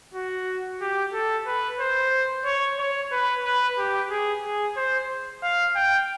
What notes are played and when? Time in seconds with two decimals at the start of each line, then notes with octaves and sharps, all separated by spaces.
0.14 F#4
0.81 G4
1.13 A4
1.47 B4
1.80 C5
2.45 C#5
2.79 C#5
3.12 B4
3.45 B4
3.78 G4
4.10 G#4
4.44 G#4
4.77 C5
5.43 F5
5.76 G5